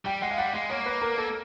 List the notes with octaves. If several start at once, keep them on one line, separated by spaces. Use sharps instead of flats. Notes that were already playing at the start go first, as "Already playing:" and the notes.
G3 G5
G#3 F#5
F5
G3 F#5
G#3 F#5
A#3 C#5
B4
A#4
A4